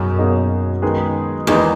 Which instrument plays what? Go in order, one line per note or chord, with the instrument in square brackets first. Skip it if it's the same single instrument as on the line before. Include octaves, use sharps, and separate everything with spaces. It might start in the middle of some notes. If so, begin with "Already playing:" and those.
Already playing: [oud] F#2 [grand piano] B2 A#3 D#4 G#4
[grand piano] B2 A#3 D#4 G#4 D#5
D#3 G#3 B3 D#4 G#4
[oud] E2 [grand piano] D#3 G#3 B3 D#4 G#4